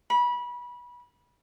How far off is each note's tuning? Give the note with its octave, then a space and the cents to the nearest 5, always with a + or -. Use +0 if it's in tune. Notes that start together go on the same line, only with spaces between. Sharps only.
B5 -25